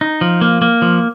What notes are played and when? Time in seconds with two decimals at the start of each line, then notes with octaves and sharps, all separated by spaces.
0.01 D#4
0.21 F3
0.41 A#3
0.62 A#3
0.82 F3